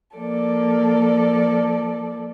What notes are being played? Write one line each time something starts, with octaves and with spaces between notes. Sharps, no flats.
F3 A#3 A4 D5